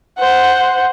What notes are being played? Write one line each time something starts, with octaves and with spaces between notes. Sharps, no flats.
C5 F#5